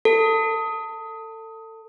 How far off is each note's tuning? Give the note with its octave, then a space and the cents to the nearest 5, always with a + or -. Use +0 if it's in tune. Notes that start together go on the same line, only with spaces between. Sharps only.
A4 +25